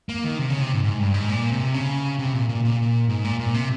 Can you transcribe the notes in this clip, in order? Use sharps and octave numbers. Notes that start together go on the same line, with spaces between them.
A#3
D#3
C3
C#3
C3
G#2
G#2
G2
G#2
A#2
C3
C#3
C3
A#2
A#2
A#2
G#2
A#2
A#2
C3